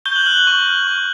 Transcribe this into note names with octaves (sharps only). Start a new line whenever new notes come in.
C#6 G6 G7
F#6 F#7
F6 F#6 F#7
F#6 F#7
C#6
F6
C#6